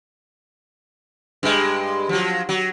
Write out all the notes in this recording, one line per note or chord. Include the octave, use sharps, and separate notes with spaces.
G2 G#3
F3 F#3
F#3